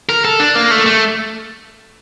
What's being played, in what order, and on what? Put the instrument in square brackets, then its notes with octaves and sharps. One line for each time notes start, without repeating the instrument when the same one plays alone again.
[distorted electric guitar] A#4
A4
D4
A#3
A3
A3